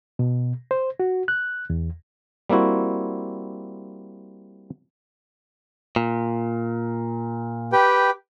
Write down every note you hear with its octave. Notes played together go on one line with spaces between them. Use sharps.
B2
C5
F#4
F#6
E2
G3 A#3 C4 E4 F#4
A#2
G4 B4 G5